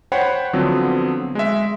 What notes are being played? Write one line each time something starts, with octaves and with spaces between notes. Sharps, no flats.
C5 C#5 F#5 G5 B5
D3 F3 F#3 B3 C4
G#3 E5